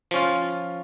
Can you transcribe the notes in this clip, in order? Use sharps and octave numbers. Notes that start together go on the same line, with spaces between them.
F3 C#4 F4